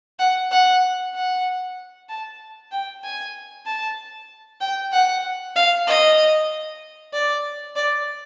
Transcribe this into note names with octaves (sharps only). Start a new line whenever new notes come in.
F#5
F#5
F#5
A5
G5
G#5
A5
G5
F#5
F5
D#5
D5
D5